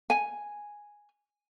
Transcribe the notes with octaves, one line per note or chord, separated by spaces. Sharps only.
G#5